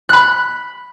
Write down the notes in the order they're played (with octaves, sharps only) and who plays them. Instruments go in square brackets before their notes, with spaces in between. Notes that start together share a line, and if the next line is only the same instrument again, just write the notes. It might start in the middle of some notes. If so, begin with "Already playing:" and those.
[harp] B5 F#6